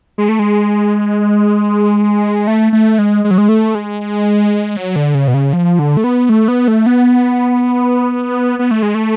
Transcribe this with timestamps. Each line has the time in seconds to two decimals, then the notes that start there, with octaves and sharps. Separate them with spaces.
0.18 G#3
0.29 A3
0.39 G#3
2.47 A3
2.73 A3
2.99 G#3
3.24 G#3
3.31 F#3
3.38 G#3
3.49 A3
3.75 G#3
4.77 F#3
4.96 D3
5.15 C#3
5.28 B2
5.34 C#3
5.53 F3
5.79 D3
5.97 A3
6.04 B3
6.29 A3
6.48 B3
6.68 A3
6.86 B3
8.59 B3
8.71 A3
8.82 G#3
8.95 A3